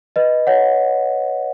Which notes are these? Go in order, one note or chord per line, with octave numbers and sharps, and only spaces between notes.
B4 D#5
C#5 F#5